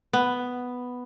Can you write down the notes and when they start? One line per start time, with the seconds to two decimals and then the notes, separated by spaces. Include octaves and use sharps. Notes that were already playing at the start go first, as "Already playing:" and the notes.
0.13 B3